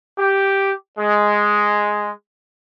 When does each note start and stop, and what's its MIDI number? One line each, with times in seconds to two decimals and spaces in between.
0.19 0.72 67
0.99 2.11 56